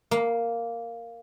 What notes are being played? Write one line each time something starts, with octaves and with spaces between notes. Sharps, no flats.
A#3